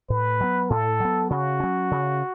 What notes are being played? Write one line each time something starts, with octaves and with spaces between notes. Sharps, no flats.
A2 B4
F#3 B3
A2 A4
F#3 B3
C#3 F#4
F#3 C#4
C#3